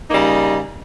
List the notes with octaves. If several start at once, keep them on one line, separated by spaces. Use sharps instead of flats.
C#3 G3 A#3 D#4